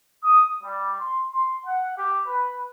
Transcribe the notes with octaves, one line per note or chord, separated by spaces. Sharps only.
D#6
G3
C6
C6
F#5
G4
B4